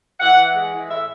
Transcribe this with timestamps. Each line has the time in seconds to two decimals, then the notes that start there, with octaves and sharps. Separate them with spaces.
0.20 E3 F#5
0.37 E3
0.54 G#3
0.72 E3
0.89 A2 E5